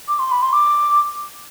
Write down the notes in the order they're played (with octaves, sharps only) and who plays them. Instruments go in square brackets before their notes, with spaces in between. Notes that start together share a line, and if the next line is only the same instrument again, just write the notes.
[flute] D6
C6
B5
C6
D6